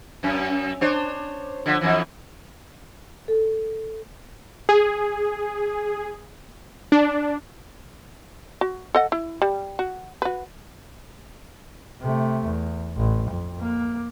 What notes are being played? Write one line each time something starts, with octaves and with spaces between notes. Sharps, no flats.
F#2 C#4
D4 C5 C#5
D3 F3
F2 E3
A4
G#4
D4
F#4
A4 D#5 F#5
E4
G3
F#4
F#4 B4
C3 A3
E2
A1
F2
A#3